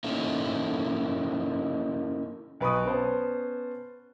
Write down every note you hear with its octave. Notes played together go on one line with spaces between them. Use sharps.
A#3 C#4 D#4 E4 A4
B1 B4 C#6 D#6
B3 C#4 C5 A5